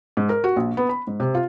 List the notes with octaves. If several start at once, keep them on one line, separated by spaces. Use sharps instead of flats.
G#2
A#4
F#4
A#1
B3
B5
G#2
C3
F4